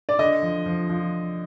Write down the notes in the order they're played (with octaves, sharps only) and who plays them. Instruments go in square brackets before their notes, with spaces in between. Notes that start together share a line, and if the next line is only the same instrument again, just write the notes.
[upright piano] D5
[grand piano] D3 [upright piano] D#5
[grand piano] F3
F3
F3